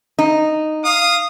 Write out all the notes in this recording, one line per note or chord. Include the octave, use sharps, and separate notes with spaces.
D#4
F5 D#6